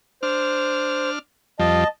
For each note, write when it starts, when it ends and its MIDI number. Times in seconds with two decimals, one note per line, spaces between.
0.23 1.19 62
0.23 1.10 72
0.23 1.19 89
1.59 1.84 41
1.59 1.84 53
1.59 1.84 55
1.59 1.87 75
1.59 1.87 81